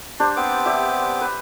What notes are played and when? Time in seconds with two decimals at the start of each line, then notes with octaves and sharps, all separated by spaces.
0.20 D4 G4 C5
0.36 B3 C4 D6
0.66 G4 D5 E5
1.21 B4